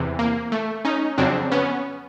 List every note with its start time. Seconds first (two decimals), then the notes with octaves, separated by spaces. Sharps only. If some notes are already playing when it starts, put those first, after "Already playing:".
Already playing: E2 C3 E3
0.19 A#3
0.52 A3
0.85 C#4 D#4
1.18 F2 C#3 F#3 C4 D4
1.52 B3 C#4